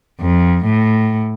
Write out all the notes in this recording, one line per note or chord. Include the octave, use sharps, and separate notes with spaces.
F2
A2